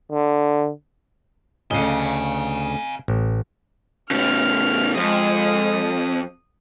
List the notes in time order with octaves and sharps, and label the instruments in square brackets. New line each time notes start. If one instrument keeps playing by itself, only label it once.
[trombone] D3
[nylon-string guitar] D2 A#2 C#3 [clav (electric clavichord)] D#5 [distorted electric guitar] F5 G#5
[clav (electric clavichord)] A1
[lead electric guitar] A2 C#3 [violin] F6
[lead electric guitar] F2 [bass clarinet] G#3 [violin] D#6